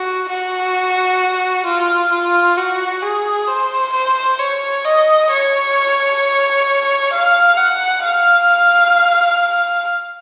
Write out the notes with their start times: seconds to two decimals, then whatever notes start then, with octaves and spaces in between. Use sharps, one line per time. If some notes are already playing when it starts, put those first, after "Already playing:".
Already playing: F#4
0.29 F#4
1.65 F4
2.12 F4
2.57 F#4
3.02 G#4
3.47 C5
3.93 C5
4.39 C#5
4.85 D#5
5.30 C#5
7.12 F5
7.57 F#5
8.04 F5